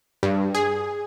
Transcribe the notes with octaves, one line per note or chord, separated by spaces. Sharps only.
G2
G#4